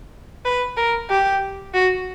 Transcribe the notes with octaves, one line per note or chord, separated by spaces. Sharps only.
B4
A#4
G4
F#4